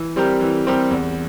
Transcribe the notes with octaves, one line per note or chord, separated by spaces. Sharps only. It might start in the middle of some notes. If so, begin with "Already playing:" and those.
Already playing: E3
G3 C4 G4 A#4
E3
G3 C4 G4 A#4
E2